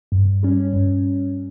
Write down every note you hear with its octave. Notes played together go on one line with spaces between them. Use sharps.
G2
G3 C#4
G2